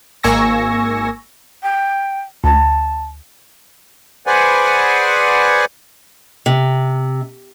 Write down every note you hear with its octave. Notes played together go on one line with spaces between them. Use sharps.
G#1 A#3 G#5 C#6 E6 A#6
G5
D2 A5
G#4 B4 C5 D5 F#5 G#5
C3